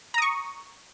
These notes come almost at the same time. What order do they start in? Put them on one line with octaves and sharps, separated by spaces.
A#5 D#6 C#6